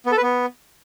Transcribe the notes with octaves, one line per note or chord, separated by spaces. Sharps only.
B3
A4
B4
B3